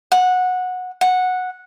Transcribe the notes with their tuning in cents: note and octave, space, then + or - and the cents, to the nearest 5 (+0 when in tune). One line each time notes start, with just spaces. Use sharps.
F#5 -15
F#5 -10